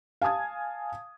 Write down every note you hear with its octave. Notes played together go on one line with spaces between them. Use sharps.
F5 G#5 A5 D#6 G#6